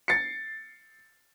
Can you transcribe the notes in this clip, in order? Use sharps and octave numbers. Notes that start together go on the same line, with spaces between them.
A6 C7 C#7